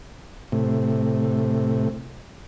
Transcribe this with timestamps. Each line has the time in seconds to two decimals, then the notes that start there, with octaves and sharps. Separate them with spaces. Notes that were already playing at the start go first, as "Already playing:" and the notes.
0.52 A2 C3